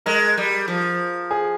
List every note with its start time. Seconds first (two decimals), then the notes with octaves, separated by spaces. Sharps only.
0.06 G#3 A#4
0.38 G3
0.68 F3
1.31 G#4